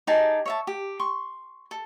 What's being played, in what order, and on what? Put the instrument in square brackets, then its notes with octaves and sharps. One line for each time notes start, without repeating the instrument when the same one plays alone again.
[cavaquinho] D#4 G4 G#4 A5
C#5 E5 A5
G4
C6 C#6
A4